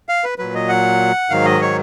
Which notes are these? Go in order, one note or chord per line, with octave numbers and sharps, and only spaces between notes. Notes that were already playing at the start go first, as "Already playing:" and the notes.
F5
B4
A#2 F#3 B4
D#5
F#5
G#2 D#3 F#3 F5
D#5
C#5